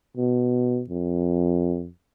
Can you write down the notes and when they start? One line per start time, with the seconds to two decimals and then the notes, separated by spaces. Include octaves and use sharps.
0.17 B2
0.90 F2